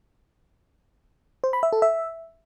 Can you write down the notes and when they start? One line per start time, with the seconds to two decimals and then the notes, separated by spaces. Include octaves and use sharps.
1.44 C5
1.53 B5
1.63 E5
1.73 A4
1.82 E5